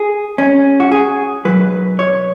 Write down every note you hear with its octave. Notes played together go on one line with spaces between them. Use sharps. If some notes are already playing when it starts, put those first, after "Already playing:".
Already playing: G#4
C#4
F#4
G#4
B1 B2 F#3 B4
C#5